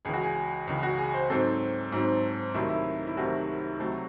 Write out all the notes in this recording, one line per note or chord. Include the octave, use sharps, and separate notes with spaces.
C#2 C#3 E3 G#4
F#4
G#4
C#2 C#3 E3
F#4
G#4
C5
G#2 F#3 C4 A4
G#2 F#3 C4
C2 C3 D#3 F#3 A3 E4
E4
E4
C2 C3 D#3 F#3 A3 F#4
C#2 C3 F#3 A3